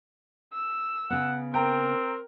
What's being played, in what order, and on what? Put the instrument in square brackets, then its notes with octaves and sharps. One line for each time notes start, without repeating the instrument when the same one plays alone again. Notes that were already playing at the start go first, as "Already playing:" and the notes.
[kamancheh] E6
[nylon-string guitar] C#3 B3 [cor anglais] F#5
[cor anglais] C4 [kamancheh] A#4 [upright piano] G5 A#5